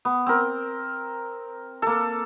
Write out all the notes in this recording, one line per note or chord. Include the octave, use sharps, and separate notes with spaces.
B3
C4 A#4
A#3 A4